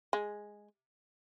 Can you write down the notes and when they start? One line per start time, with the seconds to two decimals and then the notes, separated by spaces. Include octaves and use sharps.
0.13 G#3